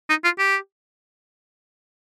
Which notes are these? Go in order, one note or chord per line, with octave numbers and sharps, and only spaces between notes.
D#4
F4
G4